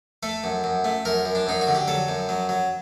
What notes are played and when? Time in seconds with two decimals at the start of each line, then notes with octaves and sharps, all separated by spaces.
0.23 A3 A4
0.44 F#2
0.64 F#2
0.84 A3
1.05 F#2 A#4
1.25 F#2
1.35 D4
1.47 F#2 D#4
1.61 F#4
1.67 D3
1.75 G4
1.88 F#3 A4
2.09 F#2
2.29 F#3
2.49 F#3